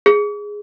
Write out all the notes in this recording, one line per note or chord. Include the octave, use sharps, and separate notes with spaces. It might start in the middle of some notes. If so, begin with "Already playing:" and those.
G#4